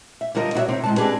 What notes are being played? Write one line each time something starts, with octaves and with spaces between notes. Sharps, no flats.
E5
D3 G3 F4 A#4 D5 D#5
D4 E4 F#4 A4 C#5 E5
C3 D#3 C4
A2 G#3 A5
C4 D4 G4 G#4 B4